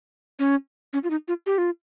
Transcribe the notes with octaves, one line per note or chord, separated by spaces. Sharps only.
C#4
C#4
F4
D#4
F4
G4
F4